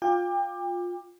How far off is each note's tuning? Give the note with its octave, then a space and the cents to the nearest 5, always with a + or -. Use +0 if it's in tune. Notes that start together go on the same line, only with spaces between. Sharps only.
F4 +20 G5 +35 D6 +15